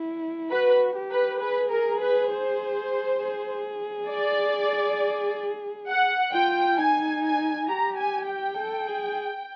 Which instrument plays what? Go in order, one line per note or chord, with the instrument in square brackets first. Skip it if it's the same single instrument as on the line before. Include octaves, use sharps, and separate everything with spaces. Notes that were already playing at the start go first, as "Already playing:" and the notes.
Already playing: [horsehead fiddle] E4
[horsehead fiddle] F#4 [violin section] B4
[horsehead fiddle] G4
[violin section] B4
[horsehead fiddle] G#4 [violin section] B4
[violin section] A#4
B4
C5
[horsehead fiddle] G#4
[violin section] D5
F#5
[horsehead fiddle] F4 [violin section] G5
[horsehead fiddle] D#4 [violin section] G#5
[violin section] G#5
[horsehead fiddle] G4 [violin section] A#5
[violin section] G#5
G5
[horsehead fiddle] A4
G#4